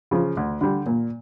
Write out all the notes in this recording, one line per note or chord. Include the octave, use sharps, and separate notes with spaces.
C#3 F3
D2
D3 G3
A#2